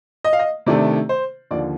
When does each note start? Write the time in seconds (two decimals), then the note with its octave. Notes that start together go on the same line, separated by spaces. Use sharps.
0.24 D#5
0.33 F5
0.39 D#5
0.66 C3 D#3 A3 D4 D5
1.09 C5
1.51 D#2 D3 F3 D5